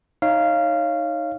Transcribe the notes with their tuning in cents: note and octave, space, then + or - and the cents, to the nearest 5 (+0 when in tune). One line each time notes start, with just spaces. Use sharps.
D#4 +0 C#5 -5 F5 -15